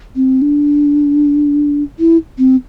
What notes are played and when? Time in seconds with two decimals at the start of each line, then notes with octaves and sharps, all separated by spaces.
0.16 C4
0.42 D4
1.99 E4
2.38 C4